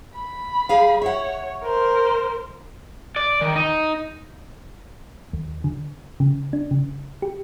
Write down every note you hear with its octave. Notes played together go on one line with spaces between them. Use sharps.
B5
G3 G#4 F5
C#5 E5 F#5
A#4 C5
D5
D#3
D#4
D#2
D3
C#3
D4
C#3
G4